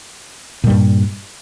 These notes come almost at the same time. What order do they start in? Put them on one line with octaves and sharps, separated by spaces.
A#2 G3 G2